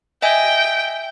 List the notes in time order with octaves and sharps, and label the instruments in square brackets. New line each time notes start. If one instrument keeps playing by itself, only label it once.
[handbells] D#5 E5 G#5 [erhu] G5